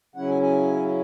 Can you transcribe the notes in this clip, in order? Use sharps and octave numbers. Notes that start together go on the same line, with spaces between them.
C#3 F#3 C#4 E4 F#5
G#5
G#5